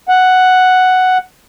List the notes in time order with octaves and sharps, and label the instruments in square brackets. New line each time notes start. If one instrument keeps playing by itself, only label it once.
[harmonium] F#5